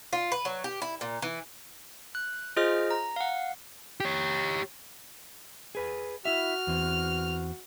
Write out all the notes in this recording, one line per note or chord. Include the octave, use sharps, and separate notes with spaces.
F4
B4
F#3
G4
E4
A#2
E3
F#6
F4 G#4 C5 D#5 F6
A#5
F5 F#5
G4 C#5
G#4 B4 G#5
E4 F#4 E5 F6
E2 E3 C4